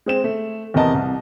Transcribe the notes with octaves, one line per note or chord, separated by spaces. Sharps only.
G#3 C4 E7
A3
E2 C3 B3 A#4 D#5 A5
C2